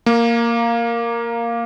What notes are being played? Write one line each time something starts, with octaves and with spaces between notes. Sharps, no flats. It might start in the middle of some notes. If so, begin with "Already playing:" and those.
A#3